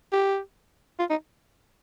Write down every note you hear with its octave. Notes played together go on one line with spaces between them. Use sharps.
G4
F4
D#4